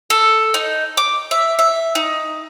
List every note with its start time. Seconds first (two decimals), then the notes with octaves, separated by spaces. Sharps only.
0.10 A4
0.54 D#4
0.97 D6
1.31 E5
1.59 E5
1.95 D#4